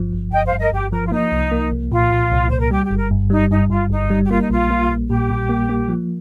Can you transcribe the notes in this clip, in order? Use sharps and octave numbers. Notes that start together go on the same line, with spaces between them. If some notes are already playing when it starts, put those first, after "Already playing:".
Already playing: G1 G2 F3
G1
G1 D#5 G5
C5 F5
G2
A#4 D#5
G1 G4
F3 A#4
F4
A#3 D#4
C2
A#3
C2
A#2 F4
A#2
C2
C2 C5
A#4
G3 G4
G4
G1
A#4
G2
G3 D#4
G2 D#4
G2 F4
G1 D#4
G3
G4
A#3 F4
D#4
A#1 F4
A#3
A#1
A#2 G4
A#2
A#3
A#3
F3